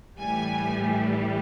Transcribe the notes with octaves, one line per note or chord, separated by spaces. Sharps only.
A2 E3 G3 G#5